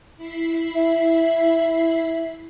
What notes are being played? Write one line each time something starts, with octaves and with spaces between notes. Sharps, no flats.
E4 B5 C7
E5